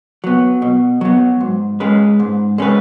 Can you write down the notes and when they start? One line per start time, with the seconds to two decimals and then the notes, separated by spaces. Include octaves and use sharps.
0.24 F#3 B3
0.62 B2
1.01 F#3 B3
1.40 G#2
1.80 G#3 C#4 B4
2.20 G#2
2.58 G#3 C#4 B4